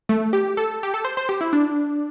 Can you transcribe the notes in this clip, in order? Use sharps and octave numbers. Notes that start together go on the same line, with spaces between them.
A3
G4
A4
G4
A4
C5
C5
G4
E4
D4